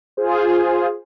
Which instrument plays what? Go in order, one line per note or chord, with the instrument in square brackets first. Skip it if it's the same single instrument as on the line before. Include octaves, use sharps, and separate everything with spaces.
[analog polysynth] F4 G#4 C5